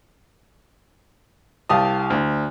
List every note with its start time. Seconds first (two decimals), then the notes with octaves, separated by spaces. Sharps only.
1.69 C2 G4 F5 A5 D#6
2.10 D2